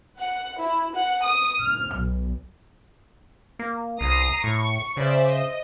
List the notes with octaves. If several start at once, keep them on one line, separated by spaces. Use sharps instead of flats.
F#5
E4
F#5
D#6
F6
B1
A#3
C2 A#5 D#6 C7
A2 C#6
C#3 C5 D5 E5
D#5